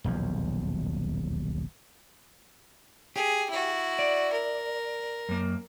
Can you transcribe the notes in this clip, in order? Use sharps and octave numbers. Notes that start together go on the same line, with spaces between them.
D#1 B1 E2 F3
G4 G#4
E4 F#4
D5
A#4
F#2 A#3